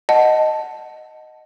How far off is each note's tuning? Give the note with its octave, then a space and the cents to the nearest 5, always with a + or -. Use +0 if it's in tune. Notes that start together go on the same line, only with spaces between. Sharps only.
D#5 +0 F#5 +0 A5 +0